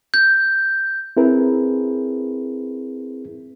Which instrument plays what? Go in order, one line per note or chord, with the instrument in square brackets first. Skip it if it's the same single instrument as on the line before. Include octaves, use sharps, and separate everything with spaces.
[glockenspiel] G6
[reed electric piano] C4 E4 G#4 A#4 B4